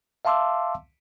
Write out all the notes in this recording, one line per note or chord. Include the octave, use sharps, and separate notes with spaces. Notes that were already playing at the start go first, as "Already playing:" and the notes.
E5 F5 A5 C6 D6 E6